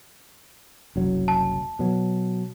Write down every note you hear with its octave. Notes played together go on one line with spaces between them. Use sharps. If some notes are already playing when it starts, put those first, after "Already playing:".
F#1 C2 F#3
A5
B2 F#3